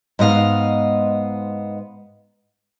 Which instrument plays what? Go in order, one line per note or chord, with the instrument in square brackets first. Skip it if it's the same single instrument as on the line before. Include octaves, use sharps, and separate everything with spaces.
[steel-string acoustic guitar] G#2 B3 D#5 F5